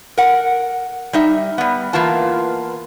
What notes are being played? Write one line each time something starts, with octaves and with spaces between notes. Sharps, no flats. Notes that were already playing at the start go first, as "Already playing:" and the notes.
A#4 F#5
G3 D#4 E5
G3 B3
E3 A#3 B3 F4 A5